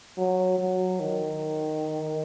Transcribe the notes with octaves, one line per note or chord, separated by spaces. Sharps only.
F#3
F#3
D#3